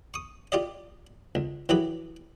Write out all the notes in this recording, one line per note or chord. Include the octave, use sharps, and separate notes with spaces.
C#6 D#6
F4 G4 D5 D#5
C#2
E3 F#3 G4 G#4 B4